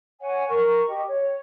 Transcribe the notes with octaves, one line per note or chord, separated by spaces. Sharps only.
C#5 F#5 G#5
A#4 C#6
G4 D#5
C#5